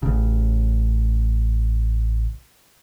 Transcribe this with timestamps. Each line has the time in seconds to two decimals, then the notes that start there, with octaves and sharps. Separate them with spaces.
0.03 A1 C#3